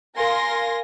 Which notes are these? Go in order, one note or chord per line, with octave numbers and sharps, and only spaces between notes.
A#4 F5 G#5 C6 A#6